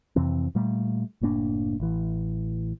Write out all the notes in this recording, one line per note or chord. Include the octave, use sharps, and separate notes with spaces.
F2 C3 E3 C4
A#2 G3 A3
F#1 A2 A#3 D4
A1 E3